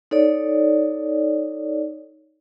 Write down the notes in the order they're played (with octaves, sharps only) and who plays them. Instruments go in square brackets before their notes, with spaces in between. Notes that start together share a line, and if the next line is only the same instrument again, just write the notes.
[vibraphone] D#4 A4 C#5 D5